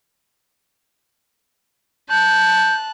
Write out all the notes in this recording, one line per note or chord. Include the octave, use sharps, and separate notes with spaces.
A5 F#6 G6